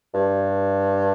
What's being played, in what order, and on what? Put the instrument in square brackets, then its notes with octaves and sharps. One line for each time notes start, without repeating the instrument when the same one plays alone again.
[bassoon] G2